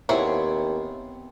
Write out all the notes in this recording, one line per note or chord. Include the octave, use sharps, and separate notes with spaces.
D#2 B3 C4 E4 G#4 C#5 D5